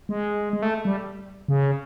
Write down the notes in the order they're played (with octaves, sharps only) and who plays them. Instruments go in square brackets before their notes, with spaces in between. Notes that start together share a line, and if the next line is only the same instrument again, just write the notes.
[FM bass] G#3
G#3
A3
G3
C#3